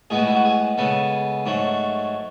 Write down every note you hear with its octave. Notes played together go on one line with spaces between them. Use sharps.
A2 G#3 B3 G#4
F#4
E4
F#4
G#4
C#3 G#3 B3 A4
G#2 F#3 A3